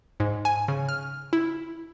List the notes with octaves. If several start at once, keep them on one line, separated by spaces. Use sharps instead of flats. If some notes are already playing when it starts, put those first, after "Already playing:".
G#2
G#5
C#3
F6
E4